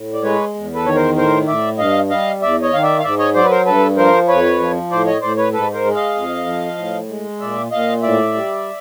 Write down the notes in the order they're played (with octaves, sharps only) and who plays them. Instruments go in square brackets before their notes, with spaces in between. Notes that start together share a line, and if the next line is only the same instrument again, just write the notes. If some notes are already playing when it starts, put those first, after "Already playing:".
Already playing: [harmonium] A2
D5
G#3 B4 C#5
E2
A4 B4
D#3 C#5
A#4 C5
A2 A#4 C5
A2 D5 E5
G2 D#5 F5
G3 D#5 F5
E2 D5 E5
C#5 D#5
D#3 F5
D5 E5
F5
G#2 D5 E5
C#5 D#5
F#3 C5 D5
B4
A#4 C5
G2 A4 B4
F3 A#4 C5
F2 B4 C#5
F3
A2 C5 D5
C#5 D#5
A2 C5 D5
B4 C#5
G#2 A4 B4
A#4 C5
G#3
D#5 F5
F2
F3
A2
G#3
A#2 D5 E5
A#2 D#5 F5
A2 D5 E5
G3